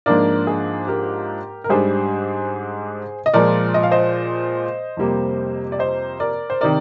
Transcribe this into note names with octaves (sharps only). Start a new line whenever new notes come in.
G#2 F3 A#3 D4 F4 A#4 D5
G#4
G4 A#4
A#4
G#2 G3 D4 G#4 C5
D#5
A#2 F3 G#3 A#4 D5
D#5
F5
C5 D#5
F2 C3 G3 A#3
D5
C5 D#5
A#4 D5
C5
C3 D#3 A#4 D5